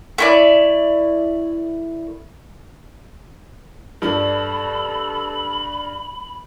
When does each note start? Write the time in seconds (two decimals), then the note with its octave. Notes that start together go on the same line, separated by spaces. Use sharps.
0.18 A3 E4 D5
4.02 G2 G3 A4 B5